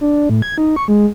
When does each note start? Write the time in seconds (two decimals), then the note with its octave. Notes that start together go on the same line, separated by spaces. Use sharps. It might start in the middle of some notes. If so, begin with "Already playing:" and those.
0.01 D4
0.29 A2
0.42 G#6
0.58 D#4
0.76 C#6
0.88 G#3